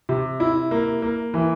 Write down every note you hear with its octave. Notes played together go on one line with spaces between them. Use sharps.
C3
E4
A#3
A#3
E3